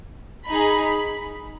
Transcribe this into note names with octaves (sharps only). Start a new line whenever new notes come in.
D#4 G#4 B5